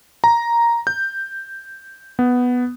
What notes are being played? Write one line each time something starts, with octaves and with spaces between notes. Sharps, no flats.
A#5
G6
B3